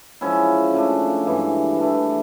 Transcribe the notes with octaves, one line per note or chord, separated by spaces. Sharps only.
F3 G#3 C#4 E4
C#3 F3 A3 D4
G2 E3 G#3
E3 A3 D4